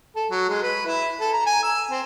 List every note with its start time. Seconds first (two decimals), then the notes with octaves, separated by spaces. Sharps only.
0.16 A4
0.31 F#3
0.49 G#3
0.63 B4
0.86 E4
1.20 A4
1.33 A#5
1.46 G#5
1.63 E6
1.91 C4